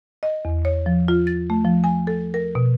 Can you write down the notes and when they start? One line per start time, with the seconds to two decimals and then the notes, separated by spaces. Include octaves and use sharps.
0.23 D#5
0.45 E2
0.65 C#5
0.86 F3
1.08 F4
1.27 A6
1.50 A3
1.65 F3
1.84 G#5
2.07 A4
2.34 A#4
2.55 B2